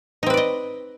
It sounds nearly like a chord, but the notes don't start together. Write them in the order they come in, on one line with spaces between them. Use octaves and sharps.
D#4 C4 B4 D5 D#5